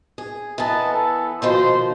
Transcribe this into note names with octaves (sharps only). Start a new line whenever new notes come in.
G#4
E3 B3 A#4 D#5 A5
A4
B2 D#3 F3 C5